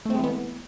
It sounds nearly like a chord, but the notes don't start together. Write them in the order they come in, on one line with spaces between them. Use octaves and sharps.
A3 C4 G#3 E3 B3